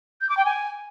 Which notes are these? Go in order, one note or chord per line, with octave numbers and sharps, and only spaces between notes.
G6
D6
G5
G#5